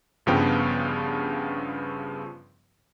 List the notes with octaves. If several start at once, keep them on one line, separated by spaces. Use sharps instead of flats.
G1 G2 C#3 F3 B3 G5